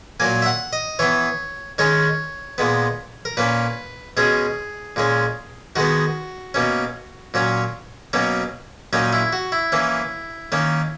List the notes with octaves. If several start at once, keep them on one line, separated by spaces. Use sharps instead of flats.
A#2 F#3 A#3 G#5
E5
F#5
D#5
E3 B3 C#5
D#3 G#3 C#4 C#5
A#2 G#3 B3
A#4
A#2 A#3 C#4 B4
B2 G#3 C#4 G#4
A#2 G#3 C#4
D#3 G#3 B3 F#4
B2 A#3 C#4
A#2 F#3 C#4
B2 F#3 A#3 C#4
A#2 F#3 A#3 C#4 D#4
E4
F#4
E4
E3 A#3 C#4
D#3 A#3 C#4